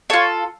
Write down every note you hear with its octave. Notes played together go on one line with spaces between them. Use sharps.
F4 A4 C#5